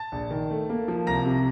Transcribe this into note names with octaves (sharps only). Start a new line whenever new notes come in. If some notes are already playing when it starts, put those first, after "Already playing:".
Already playing: A5 A6
A#1
D#3
A3
A#3
F3
C2 A#5 A#6
C3